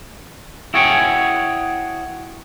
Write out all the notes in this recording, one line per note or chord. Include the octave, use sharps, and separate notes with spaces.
E4 F#4 G#4 C#5 G5 G#5